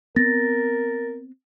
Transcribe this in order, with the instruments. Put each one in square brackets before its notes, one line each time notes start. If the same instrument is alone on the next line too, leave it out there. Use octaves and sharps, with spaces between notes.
[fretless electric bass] B3 C4 [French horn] A#4 [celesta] A6 A#6